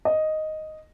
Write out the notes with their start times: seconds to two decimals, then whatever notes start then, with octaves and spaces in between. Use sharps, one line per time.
0.05 D#5